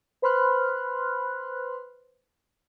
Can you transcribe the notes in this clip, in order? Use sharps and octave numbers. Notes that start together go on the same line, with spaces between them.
B4 C5 B5 C6 F6 F#6